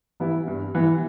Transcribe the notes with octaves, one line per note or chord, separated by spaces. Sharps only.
E3 G3 B3 E4
G2
E3 G3 B3 E4